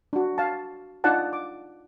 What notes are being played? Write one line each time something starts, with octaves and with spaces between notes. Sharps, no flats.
D4 F#4
F5 A5
D4 D#4 F4 D5 F#5 A5
D6